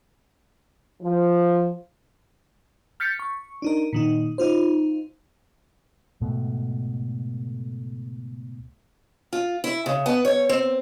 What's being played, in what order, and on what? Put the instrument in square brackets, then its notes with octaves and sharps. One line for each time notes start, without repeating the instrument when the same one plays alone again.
[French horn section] F3
[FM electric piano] F6 G6 A6 B6 C#7
C#6
D4 D#4 A#4
A#2 D#3 D#4
D#4 F4 C5
[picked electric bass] C#2 G#2 B2 A3
[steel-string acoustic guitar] F4
E4
C#3
B3
C#5
C4